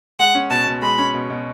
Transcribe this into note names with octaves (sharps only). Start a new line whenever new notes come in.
G#3 F#5
C#4
B2 A5
B2
G#3 B5
C#4
B2
B2